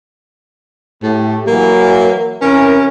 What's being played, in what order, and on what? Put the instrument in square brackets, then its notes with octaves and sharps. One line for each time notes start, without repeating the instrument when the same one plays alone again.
[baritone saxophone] A2 [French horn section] A3 G4
[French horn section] E3 F#3 [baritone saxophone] A#3
[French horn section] C3 E3 A#4 [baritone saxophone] C#4